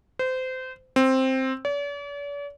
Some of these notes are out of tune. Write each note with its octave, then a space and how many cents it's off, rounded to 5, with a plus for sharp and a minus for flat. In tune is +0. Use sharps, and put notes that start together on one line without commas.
C5 -25
C4 +5
D5 -45